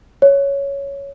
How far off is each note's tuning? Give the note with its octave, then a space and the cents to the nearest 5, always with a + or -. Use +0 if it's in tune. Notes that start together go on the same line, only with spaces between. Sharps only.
C#5 +5